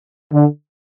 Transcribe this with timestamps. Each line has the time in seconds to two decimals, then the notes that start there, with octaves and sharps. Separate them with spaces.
0.33 D3